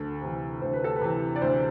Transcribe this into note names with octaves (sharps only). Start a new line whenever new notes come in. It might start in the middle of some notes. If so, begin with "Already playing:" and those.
Already playing: D2 A4
C3 E3
D2 C5
B4
A4
B4
C3 E3
D5
D2 C5